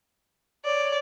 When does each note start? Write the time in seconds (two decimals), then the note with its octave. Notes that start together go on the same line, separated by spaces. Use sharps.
0.65 C#5 D5